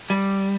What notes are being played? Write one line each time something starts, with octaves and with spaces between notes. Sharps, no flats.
G3